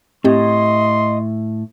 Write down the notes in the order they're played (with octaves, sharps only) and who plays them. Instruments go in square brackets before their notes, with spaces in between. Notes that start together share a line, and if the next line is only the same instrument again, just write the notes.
[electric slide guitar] A2 [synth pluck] C4 G4 [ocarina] D#5 [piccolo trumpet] C6